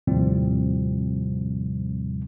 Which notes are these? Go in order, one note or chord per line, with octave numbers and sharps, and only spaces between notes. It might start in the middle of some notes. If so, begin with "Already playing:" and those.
D#2 A2 C3 F3 G3 C4